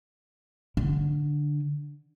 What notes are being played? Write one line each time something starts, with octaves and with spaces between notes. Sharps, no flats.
D3